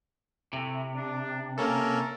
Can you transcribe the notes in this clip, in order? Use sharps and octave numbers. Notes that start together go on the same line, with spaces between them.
C3 A3 E4
D4
A#3 C#4 A4 A#4